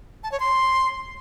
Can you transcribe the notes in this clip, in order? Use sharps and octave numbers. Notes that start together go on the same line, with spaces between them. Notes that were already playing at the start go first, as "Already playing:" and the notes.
A5
C#5
C6